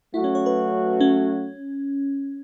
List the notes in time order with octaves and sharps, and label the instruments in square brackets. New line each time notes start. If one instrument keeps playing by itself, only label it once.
[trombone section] F#3 A3 F#4 [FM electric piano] E4
[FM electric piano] C#4
C#5
B4
C#4